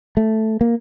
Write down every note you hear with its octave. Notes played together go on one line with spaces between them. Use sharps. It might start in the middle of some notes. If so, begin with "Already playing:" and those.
A3
A#3